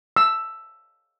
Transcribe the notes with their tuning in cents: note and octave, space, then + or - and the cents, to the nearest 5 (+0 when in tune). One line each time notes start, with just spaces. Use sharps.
E6 +5